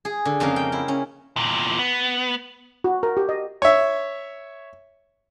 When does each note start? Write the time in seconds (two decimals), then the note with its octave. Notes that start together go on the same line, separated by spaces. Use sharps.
0.05 G#4
0.25 D3
0.40 F2 C#3 A#3 D#4 A#4
0.56 G5
0.72 E4
0.88 C#4
1.36 E2 A#2
1.79 B3
2.84 F#4
3.03 A#4
3.17 G4
3.29 D#5
3.62 C#5 E5